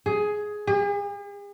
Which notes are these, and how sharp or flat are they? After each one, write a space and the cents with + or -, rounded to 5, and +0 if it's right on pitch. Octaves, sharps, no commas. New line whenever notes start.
G#4 +10
G#4 -45